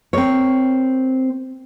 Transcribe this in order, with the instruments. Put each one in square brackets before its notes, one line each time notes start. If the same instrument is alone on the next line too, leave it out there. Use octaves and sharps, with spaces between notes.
[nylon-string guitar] C4 A#4 C#5